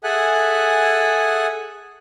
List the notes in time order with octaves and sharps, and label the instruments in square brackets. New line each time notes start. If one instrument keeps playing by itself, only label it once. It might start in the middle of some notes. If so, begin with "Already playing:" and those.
[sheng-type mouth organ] G#4 A4 E5 F#5 G#5 F#6